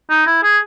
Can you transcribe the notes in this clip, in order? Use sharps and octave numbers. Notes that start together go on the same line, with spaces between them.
D#4
E4
G#4